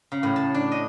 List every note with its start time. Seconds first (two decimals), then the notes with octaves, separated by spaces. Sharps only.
0.12 C#3
0.23 A2
0.36 A5
0.54 D4
0.72 D#5